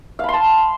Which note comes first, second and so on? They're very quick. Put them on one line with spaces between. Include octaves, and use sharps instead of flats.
F5 B5 C6 A5